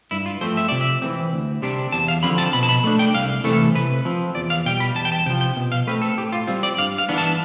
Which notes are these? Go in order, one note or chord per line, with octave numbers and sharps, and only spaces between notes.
G2 E4
F4
F3 A3 C4 C5
E5
C3 D5
E5
E3 A3 C4
D2
C3 G3 D4
E2 A5
F5
D3 F3 C4 B5
A5
B2 B5
A5
B5
A3 D4
G5
C2 F5
C3 E3 A3 A4
C3 B4
F3 C4
E2 D5
F5
B2 G3 G5
B5
E2 A5
G5
A5
C3 F3 G5
G5
B2
F5
A3 C4 B4
A4
A2 G4
F4
G3 C4 F4
D5
G2 F5
F5
E3 B3 D4
A5